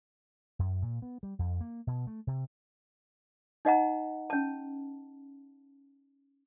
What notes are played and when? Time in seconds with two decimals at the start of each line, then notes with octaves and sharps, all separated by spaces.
0.59 F#2
0.82 A#2
1.02 B3
1.23 G3
1.39 F2
1.61 A#3
1.87 B2
2.07 A3
2.27 C3
3.65 D#4 D#5 F#5 A#5
4.30 C#4 A5